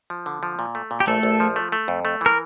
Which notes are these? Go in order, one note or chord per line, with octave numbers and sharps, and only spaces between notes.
F3
D3
F3
A#2
A3
A#2
G4
A#1 A3 A4
A#1
F3
A3
A3
F2
A3
E3 A#4